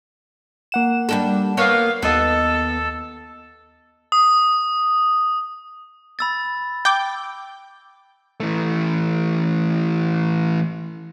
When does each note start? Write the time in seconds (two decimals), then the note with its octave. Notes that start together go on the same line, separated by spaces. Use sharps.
0.72 A#3 F#5 E7
1.09 G3 D4 A4
1.57 A#3 B3 C#5 F5
2.02 D#2 B3 A4 D#5
4.12 D#6
6.19 B5 E6 A6
6.85 G5 D6 G6
8.40 E3 A3